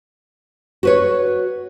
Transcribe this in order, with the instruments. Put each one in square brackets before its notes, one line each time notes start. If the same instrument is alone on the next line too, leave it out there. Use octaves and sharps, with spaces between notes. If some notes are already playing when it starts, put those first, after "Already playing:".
[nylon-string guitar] F#4 B4 C#5